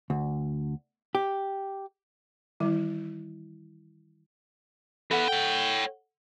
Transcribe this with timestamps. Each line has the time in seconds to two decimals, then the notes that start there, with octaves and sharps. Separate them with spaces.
0.10 D2
1.15 G4
2.60 D#3 E3 G3 E4
5.11 E3 B3 A4 F#5
5.28 C#5 G5